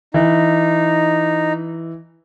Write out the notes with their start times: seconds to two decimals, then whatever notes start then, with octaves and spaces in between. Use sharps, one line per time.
0.14 E3 D#4